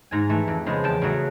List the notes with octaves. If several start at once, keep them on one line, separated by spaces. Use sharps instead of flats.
G#2 G#5 A#5
E3 A3
F2
C#3 F3 G#3 B3
E2 G5 A5
C#3 F#3 A3